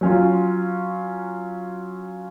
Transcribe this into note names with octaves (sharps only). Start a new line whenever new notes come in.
F#3 C#4 F4